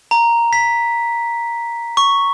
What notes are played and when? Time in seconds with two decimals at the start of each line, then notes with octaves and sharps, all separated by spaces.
0.11 A#5
0.53 B6
1.97 C#6